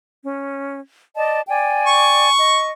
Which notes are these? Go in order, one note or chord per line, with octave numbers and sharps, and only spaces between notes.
C#4
D5 D#5 A5
D5 G5 G#5
C#6
D#5